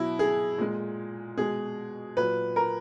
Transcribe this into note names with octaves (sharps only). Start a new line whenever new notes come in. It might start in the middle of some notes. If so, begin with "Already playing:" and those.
Already playing: B2 F#3 E4
G#4
A#2 G#3
B2 G#3 G#4
A#2 F#3 B4
A#4